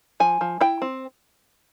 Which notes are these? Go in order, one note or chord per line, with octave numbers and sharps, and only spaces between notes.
F3 G#5
F3
E4 G5
C4